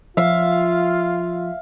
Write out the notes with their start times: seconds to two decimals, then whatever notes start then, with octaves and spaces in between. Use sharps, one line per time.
0.17 F3 F4 E5 F5